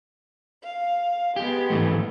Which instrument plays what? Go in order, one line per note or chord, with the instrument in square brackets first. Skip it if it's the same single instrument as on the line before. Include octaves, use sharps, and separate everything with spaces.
[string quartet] F5
[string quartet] G#3 B3 [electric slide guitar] G4
[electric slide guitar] G#2 E3 A3